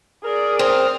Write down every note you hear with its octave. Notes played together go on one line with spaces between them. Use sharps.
G#4 A#4 D5
C4 D#6 F6